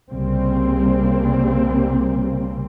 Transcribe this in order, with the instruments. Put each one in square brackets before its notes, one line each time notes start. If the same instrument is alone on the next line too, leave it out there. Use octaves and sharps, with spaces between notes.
[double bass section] C2 C#3 G3 A#3 C4